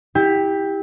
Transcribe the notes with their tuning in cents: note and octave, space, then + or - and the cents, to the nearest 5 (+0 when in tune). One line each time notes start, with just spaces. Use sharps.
E4 -25 G4 +15